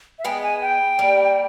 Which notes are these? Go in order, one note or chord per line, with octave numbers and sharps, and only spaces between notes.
E5
G#3 B3 G5
G#5
G5
G3 A#3